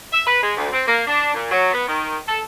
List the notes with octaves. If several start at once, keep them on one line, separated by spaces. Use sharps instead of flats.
E5
B4
G#3
D2
C4
A#3
D4
A#2
F#3
B3
D#3
A4